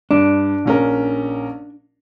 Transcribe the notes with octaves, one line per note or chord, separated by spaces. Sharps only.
G2 D4
A#1 C#4 A#4